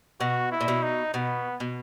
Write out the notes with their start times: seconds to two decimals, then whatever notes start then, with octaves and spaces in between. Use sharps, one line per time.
0.21 B2 F#4
0.52 E4
0.61 A#2
0.68 B2
0.83 D#4
1.14 B2 B3
1.60 B2